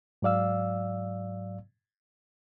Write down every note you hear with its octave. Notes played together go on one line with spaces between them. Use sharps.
G#2 F#3 D5 F5 E6